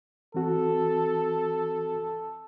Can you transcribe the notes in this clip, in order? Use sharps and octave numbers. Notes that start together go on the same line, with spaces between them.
E3 C4 F#4 A4